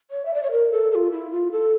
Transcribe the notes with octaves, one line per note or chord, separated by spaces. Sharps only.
C#5
E5
D5
C#5
A#4
A4
A4
F4
E4
F4
A4